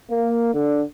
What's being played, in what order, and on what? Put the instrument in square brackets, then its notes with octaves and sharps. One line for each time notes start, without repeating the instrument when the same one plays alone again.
[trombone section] A#3
D3